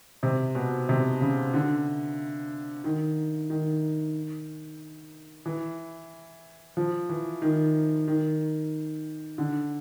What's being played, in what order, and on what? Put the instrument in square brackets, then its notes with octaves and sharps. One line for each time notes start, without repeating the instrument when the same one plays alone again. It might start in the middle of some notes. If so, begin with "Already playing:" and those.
[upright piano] C3
B2
C3
C#3
D3
D#3
D#3
E3
F3
E3
D#3
D#3
D3